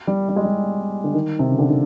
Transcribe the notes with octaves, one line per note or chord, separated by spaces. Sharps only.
G3
G3
G#3
G3
D3
D#3
C3
C#3
D3
D#3